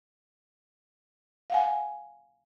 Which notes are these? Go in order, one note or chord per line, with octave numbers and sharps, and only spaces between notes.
F5 F#5 G#5